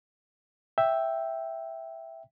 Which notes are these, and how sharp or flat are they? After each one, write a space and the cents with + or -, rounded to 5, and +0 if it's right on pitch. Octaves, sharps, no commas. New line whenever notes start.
E5 +0 G5 +0